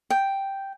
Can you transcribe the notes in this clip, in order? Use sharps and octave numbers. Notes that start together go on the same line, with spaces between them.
G5